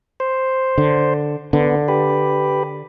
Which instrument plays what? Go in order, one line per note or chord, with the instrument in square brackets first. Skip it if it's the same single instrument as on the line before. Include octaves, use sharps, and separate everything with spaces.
[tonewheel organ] C5
[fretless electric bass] D3
[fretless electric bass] D3 [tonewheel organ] B3
[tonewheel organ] G4 B4